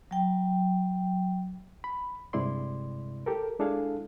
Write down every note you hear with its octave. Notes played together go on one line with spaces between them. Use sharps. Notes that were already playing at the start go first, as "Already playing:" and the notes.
F#3 G5
B5
G2 C3 G#3 E4 D5 C6
G4 A4 A#4
G#3 D4 E4 G#4 A4 F5